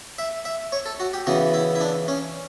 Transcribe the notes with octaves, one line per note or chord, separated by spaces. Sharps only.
E5
E5
C#5
A4
F#4
G4
C#3 E3 B3 F#4
E4
E4
D4
C#4